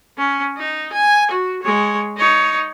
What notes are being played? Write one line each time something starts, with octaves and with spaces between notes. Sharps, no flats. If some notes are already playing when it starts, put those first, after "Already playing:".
C#4
D#4
G#5
F#4
G#3 C#5
D#4 C#5